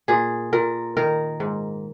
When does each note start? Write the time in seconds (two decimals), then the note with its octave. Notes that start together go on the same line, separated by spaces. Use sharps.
0.08 A#2 G#4
0.53 A#2 A#4
0.97 D#3 A#4
1.40 G#2